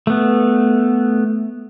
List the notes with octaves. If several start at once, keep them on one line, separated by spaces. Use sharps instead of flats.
A3 B3